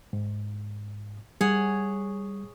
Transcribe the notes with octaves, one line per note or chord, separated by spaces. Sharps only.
G#2
G3 G#4 C#5 F#5